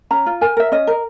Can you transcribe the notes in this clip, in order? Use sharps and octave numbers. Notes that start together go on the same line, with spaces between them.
C#4 A#5
F4
A#4 G#5
A#4 E5
C#4 D#5
A#4